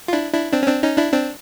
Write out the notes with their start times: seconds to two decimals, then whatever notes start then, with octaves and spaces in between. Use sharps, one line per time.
0.08 F4
0.13 D4 E4
0.33 D4 E4
0.53 C4 D4
0.63 C#4
0.67 C4 D4
0.83 C#4 D#4
0.98 D4 E4
1.13 C4 D4